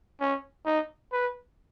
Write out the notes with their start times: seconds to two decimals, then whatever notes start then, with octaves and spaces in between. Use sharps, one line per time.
0.21 C#4
0.66 D#4
1.13 B4